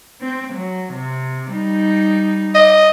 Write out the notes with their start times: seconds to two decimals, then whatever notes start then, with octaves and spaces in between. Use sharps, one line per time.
0.21 C4
0.54 F#3
0.94 C3
1.51 G3 D#4
2.55 D#5